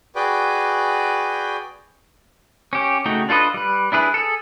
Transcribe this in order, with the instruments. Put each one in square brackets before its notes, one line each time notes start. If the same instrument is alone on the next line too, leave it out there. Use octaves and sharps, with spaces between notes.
[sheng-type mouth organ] F#4 G#4 B4 D5 G5
[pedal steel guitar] C#4 G4
C#3 A3 D#4 F#4 G5
D4 F4 A4 B4 D#5
G3 B4
D4 E4 G#4 B4
G#4 A4